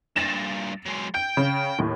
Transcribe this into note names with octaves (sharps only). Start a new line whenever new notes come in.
G2 A#2 A6 A#6 E7
F#3 G#3
G5 G6
C#3
D#2 A2